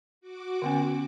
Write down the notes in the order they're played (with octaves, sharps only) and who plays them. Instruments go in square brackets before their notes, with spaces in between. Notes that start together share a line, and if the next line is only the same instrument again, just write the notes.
[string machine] F#4 D6
[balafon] D3 B3 C#4